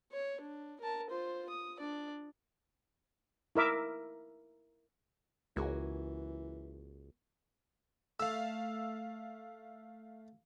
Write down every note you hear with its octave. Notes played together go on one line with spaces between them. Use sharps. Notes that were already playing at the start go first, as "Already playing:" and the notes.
C#5
D4
A#4 A5
F4 C5
D#6
D4 D5
E4 A#4 E5 D6
C#2 E3 A#3 F#4 G#4
A3 F5 E6